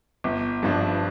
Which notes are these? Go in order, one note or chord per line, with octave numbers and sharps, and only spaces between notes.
G1
G2 F3 D4